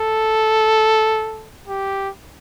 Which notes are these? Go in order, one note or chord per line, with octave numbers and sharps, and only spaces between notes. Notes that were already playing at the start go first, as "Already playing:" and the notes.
Already playing: A4
G4